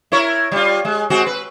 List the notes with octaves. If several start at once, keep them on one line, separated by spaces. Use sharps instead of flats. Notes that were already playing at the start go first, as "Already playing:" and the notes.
E4 A#4 C#5
G3 F4
G#3
G#3 C4 F#4
B4